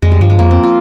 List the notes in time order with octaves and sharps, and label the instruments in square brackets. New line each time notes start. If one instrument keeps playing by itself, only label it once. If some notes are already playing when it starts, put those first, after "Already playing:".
[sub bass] F2 [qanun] G#3
[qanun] G3
[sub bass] G2 [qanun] F3
[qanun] G#3
[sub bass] F2 [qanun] A#3
[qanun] C4
F4